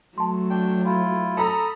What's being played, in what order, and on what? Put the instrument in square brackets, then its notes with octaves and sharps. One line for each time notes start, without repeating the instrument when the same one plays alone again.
[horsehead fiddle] F#3 A3 [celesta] A5 C6
[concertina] D4 G5
E4 F4
[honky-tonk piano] A4 A#5 [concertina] B5 D#6